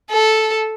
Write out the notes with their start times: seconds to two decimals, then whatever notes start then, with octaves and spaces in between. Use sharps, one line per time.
0.11 A4